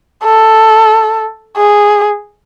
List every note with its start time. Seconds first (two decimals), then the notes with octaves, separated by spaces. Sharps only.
0.24 A4
1.57 G#4